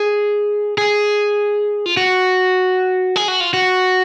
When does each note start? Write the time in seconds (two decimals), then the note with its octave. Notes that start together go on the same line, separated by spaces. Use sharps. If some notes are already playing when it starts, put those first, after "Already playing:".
Already playing: G#4
0.78 G#4
1.86 F4
1.97 F#4
3.16 G#4
3.28 F#4
3.40 F4
3.54 F#4